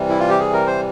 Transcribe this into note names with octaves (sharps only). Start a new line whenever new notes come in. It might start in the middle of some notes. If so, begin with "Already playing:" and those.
Already playing: C3 E3 G3
E4
F4
G4
G#4
A#4
C5